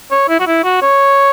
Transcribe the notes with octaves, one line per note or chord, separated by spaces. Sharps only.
C#5
E4
F#4
E4
F#4
C#5